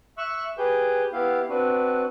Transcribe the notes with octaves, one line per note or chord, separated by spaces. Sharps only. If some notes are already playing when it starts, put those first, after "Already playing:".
E5 C#6 E6 F#6
G4 G#4 B4 G6
B3 E4 G4 F5
C4 D4 F#4 B4